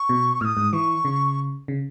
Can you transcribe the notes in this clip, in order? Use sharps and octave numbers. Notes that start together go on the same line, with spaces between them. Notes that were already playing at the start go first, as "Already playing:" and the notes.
Already playing: C#6
B2
A2 D#6 F6
G#2
E3 C#6
C#3
C#3